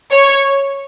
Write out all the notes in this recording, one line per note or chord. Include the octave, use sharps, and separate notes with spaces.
C#5